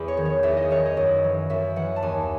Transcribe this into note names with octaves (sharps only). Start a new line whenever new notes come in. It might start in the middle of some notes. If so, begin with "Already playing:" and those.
Already playing: E2 B5
C#5
D#3
C#5
E2 E5
D#5
D#3 C#5
D#5
F#2
E3
F#2 E5
E3 F#5
A5
D#2 G#5